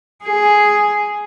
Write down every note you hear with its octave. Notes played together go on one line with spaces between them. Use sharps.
G#4